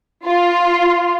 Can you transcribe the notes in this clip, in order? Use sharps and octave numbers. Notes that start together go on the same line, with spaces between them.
F4